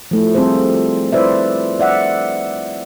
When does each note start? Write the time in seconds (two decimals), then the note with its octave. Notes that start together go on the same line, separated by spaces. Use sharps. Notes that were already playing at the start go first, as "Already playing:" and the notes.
0.11 F3 A3 E4
0.35 G3 C4 F4 G#4 A4 C5
1.13 E4 F4 B4 C5 D5 E5
1.80 D5 E5 F#5